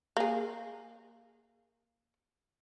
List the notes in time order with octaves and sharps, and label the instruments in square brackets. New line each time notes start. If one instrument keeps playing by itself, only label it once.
[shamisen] A#3 G#4